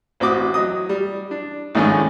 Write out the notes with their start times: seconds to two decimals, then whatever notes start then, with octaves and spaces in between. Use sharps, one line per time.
0.20 A1 C4 F#4 D6 D#6
0.54 F#3 D#5 D#6
0.89 G3
1.31 D4
1.75 A#1 G#2 D#3 A3 C#4 G#4